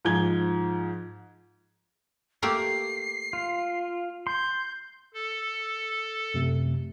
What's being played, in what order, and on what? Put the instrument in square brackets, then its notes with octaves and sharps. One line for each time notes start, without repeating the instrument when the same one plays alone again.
[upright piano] G#2 F3 G#5 G#6 G7
[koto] A3 A#3 G4 [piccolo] C7
[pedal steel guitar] F4
[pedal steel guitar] C6 [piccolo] G6
[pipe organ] A4
[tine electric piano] F#2 C3 A3